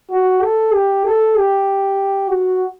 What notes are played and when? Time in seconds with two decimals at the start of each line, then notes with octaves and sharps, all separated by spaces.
0.10 F#4
0.42 A4
0.73 G4
1.05 A4
1.37 G4
2.30 F#4